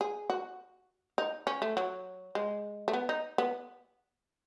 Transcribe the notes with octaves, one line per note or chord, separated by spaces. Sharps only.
G#4
F#4
D#4
C#4
A3
F#3
G#3
A3
B3
D#4
B3